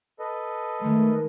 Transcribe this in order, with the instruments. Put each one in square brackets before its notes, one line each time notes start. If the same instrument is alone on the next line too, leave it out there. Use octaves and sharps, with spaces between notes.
[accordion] A4 B4 D#5
[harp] D#3 G#3 [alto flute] A3